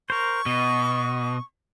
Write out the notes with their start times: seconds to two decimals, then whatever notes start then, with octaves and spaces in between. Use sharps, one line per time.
0.10 A#4 C5 C#6
0.46 B2 D#5